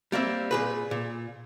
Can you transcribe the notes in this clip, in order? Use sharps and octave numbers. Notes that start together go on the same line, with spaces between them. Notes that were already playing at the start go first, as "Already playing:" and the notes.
G3 A#3 C4 E5
A#2 G#4 B4
A#2